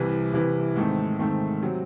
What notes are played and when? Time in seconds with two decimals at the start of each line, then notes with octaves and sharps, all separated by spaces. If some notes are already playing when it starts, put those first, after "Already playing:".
Already playing: C2 C3 E3
0.33 C2 C3 E3
0.76 G#2 D#3 A3 C4
1.18 G#2 D#3 A3 C4
1.62 C3 F#3 C4